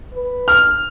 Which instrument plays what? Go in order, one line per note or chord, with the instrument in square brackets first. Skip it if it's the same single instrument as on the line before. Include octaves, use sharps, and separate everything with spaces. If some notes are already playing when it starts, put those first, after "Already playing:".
[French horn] B4
[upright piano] F6